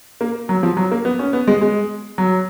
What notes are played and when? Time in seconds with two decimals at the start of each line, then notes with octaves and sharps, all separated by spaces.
0.21 A#3
0.49 F#3
0.63 F3
0.77 F#3
0.92 A#3
1.05 B3
1.19 C#4
1.33 B3
1.48 G#3
1.61 G#3
2.18 F#3